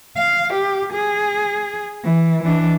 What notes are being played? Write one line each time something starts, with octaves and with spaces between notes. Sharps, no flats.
F5
G4
G#4
E3
E3 D4